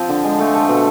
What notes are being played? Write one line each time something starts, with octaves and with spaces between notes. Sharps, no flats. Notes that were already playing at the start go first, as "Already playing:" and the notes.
Already playing: F3 C4
D3
G#3
A3
A3
B2